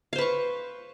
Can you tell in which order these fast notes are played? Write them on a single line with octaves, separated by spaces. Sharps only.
F5 C5 B4 C#6